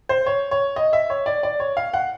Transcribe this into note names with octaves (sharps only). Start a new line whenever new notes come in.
C5
C#5
C#5
D#5
E5
C#5
D5
D5
C#5
F5
F#5